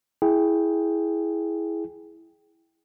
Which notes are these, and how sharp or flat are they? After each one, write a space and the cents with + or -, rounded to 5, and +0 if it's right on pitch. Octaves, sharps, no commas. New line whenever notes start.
E4 +0 G#4 +10 G5 +0